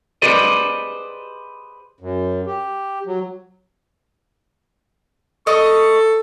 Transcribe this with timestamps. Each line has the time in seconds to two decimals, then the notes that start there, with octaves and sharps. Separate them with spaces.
0.22 G4 G#4 B4 C5 D5 D#5
2.01 F#2
2.47 G4
3.06 F#3
5.47 A4 D#5 C#6